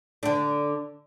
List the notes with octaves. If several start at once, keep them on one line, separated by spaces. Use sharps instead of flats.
D3 D4